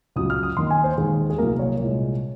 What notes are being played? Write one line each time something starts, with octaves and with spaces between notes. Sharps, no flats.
C#2 C#3 F#3 D#6
F6
D#6
D#2 D#3 A#3 C6
G#5
C5
D#2 D#3 G#3 G#4
G#4
C2 C3 F#3 A#3 A#4
C#5
C2 A#2 G#3